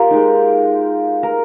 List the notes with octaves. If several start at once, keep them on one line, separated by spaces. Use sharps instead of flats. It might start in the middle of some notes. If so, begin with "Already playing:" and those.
Already playing: A#3 F4 G4 A#4
G#3 D#4
A#4